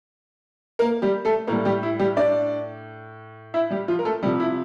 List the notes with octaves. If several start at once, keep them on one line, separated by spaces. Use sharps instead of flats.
A#3 A#4
G3 G4
A3 A4
A2 G3 A#3 A#4
G3 G4
E4
G3 G4
D4 D5
E4 E5
G3 G4
F3 F4
A#4
A3 A4
C3 F3 G3 G4
E4